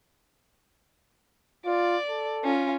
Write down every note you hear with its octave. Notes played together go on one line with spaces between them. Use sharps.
F4 D5
A4
C#4 F4